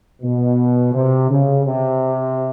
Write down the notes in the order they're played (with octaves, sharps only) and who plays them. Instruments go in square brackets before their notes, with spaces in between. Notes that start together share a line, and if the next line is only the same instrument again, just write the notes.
[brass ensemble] B2
C3
C#3
C3